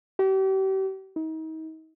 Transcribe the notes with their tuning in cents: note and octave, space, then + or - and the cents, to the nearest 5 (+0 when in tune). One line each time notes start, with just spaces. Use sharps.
G4 -40
D#4 +35